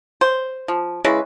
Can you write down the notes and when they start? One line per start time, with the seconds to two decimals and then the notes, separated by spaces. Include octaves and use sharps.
0.21 C5
0.68 F3
1.04 C#3 G#3 E4 B4